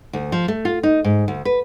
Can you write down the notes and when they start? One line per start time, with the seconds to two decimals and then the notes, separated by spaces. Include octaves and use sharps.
0.13 D2
0.32 F3
0.48 A3
0.65 F4
0.83 D#4
1.04 G#2
1.28 D2
1.45 B4